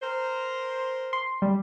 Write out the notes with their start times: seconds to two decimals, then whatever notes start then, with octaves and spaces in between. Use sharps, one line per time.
0.01 A#4 C5
1.13 C6
1.42 G3